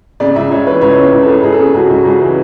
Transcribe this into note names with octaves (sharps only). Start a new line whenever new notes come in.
C#3 D5
C#2 E5
C#2 C#5
E3 B4
C#2 C#5
C#3
B4
C#2
A4
C#2
C#2 G#4
A4
C#3 G#4
C#2 F#4
C#2
C#2 G#4
E3